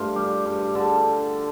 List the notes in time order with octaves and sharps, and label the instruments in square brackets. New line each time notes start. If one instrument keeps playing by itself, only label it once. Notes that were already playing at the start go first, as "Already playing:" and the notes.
Already playing: [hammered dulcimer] G2 A3 F4 F5
G3 G4
G2
D3 A4